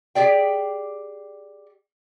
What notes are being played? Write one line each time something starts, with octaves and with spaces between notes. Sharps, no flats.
G4 G#4 D5 G5